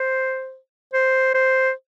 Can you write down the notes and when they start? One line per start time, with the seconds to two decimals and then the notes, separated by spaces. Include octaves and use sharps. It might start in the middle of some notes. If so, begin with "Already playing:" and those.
Already playing: C5
0.93 C5
1.34 C5